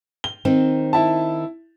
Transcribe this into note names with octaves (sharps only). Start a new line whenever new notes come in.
G7
D#3 C4 D#4
E4 A5